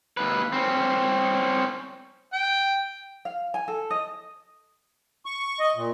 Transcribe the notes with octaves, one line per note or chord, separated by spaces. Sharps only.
D#2 B4
C4 C#4
G5
F5
G#5
A4
D#5
C#6
D#5
A#2